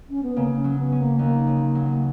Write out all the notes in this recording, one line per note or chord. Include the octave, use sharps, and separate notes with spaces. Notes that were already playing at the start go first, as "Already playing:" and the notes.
C#4
B3
C#3 A#3
C#4
F#3
B3
C#4
A#3
D#2 A#3
C#3
F#3